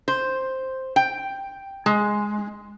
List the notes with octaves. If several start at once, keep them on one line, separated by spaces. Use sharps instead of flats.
C5
G5
G#3